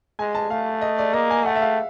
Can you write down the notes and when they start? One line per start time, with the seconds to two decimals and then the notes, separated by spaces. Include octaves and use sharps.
0.19 G#3 G#5
0.35 A5
0.50 A3 F5
0.82 D#5
0.98 D5
1.13 A#3 D#5
1.30 G#5
1.46 A3 F#5
1.56 E5
1.62 F5